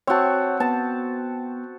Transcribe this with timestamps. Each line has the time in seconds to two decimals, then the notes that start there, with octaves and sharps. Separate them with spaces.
0.07 C4 F#4 C#5 A5
0.60 B3 A5